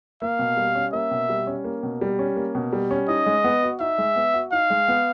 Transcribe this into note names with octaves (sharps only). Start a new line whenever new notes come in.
A#3 F5
B2
G3
C#4
A#3 E5
B2
G3
C#4
A#3
B2
G3
C#4
A#3
B2
G3
C#4
D#4 D#5
G#3
B3
F#4
D#4 E5
G#3
B3
F#4
D#4 F5
G#3
B3